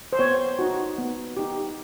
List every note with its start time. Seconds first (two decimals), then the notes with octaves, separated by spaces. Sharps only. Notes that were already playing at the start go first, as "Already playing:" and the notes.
0.13 C5
0.19 B3 C#5
0.59 D#4 F#4
0.98 B3
1.37 D#4 G4